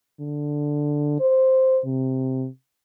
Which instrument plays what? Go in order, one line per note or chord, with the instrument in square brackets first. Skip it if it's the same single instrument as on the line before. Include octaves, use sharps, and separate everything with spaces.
[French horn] D3
C5
C3